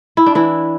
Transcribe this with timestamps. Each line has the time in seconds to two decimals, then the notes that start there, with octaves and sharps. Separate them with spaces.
0.17 E4
0.26 D4
0.35 E3 E4